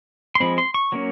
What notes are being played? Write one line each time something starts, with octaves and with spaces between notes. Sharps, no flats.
C6
F3 G#3 C4 B5
C6
C#6
F#3 A#3 C#4